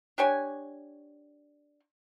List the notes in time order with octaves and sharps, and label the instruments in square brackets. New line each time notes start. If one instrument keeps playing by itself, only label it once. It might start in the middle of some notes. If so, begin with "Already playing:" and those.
[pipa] D4 G4 C#5 G#5